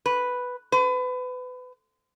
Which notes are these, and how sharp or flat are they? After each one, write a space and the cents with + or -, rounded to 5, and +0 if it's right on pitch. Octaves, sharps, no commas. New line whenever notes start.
B4 +0
B4 +30